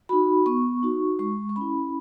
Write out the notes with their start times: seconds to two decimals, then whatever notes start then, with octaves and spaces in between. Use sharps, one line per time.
0.09 D#4 F#4 B5
0.46 B3 C#6
0.83 D#4 F#4
1.19 G#3 C#6
1.49 C#6
1.56 C#4 E4 B5